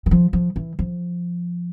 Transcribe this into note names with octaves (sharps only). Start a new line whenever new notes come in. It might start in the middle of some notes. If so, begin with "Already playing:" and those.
E3
F3
F3
E3
F3